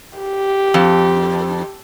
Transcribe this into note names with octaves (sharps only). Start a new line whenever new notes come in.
G4
F2